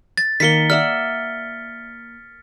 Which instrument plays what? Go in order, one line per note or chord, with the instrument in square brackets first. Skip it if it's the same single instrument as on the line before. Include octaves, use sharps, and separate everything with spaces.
[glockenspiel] A6
[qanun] D#3 A#3 [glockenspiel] B6 C#7 G7
[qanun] D5 E5 F#5 [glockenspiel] F6